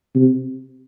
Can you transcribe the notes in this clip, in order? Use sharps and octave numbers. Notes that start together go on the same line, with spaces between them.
C3